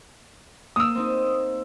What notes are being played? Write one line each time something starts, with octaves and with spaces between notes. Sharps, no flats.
A#3 D#6 E6
C4 D#4